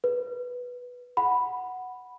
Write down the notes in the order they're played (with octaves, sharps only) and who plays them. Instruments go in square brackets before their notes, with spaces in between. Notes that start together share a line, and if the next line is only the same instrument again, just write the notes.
[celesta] B4
F#5 B5